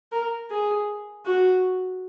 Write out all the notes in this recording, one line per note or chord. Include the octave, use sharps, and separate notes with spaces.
A#4
G#4
F#4